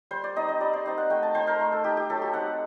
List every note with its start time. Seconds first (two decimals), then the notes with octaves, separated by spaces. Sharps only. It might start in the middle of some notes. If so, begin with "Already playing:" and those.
0.11 G3 C5
0.24 D5
0.36 C4 D#4 D#5
0.48 D#5
0.60 G3 D5
0.73 C5
0.85 C4 D#4 D#5
0.98 F#5
1.10 A3 G5
1.23 A5
1.35 D#4 C5
1.47 A#4
1.60 A3
1.72 A4
1.84 D#4 G4
1.97 G4
2.10 F#3 A4
2.22 G4
2.33 C4 D#4 F#5